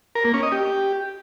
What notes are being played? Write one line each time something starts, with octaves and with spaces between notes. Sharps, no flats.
A#4
A#3
C#4
D#5
G4